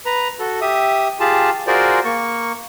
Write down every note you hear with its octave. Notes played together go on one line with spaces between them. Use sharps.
B4 A#5
F#4 A4
G4 E5 D#6
F4 G4 G#4 A5
F4 F#4 G#4 A#4 C5 D5
A#3 C#6